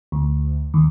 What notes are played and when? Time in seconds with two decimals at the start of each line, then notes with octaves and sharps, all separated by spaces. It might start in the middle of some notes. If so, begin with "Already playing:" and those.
0.12 D2
0.74 D#2